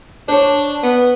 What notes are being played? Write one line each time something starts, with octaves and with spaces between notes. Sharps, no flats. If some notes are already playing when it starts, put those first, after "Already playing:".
D4 C5 C#5
B3